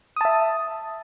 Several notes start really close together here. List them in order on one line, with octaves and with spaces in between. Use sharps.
D#6 A5 E5